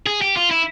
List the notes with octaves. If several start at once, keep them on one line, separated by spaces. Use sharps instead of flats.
G#4
G4
F4
E4